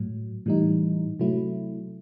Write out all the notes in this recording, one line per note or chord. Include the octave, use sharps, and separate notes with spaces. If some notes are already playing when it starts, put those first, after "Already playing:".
Already playing: A2 F#3
A2 E3 G3 D#4
C3 F#3 A3 E4